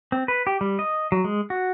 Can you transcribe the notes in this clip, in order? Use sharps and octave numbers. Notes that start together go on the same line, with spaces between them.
C4
B4
G4
G3
D#5
F#3
G#3
F#4